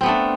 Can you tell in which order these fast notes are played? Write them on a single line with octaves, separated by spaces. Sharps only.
C4 B3 A3 D4